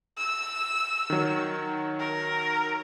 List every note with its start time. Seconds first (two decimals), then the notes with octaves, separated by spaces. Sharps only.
0.18 E6
1.10 D#3 F#3
1.99 A#4